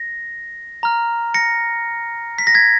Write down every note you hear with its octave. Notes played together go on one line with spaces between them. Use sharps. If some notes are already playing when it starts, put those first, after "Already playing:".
Already playing: A#6
A#5 F6
A#6 C#7
B6
A#6
G#6 B6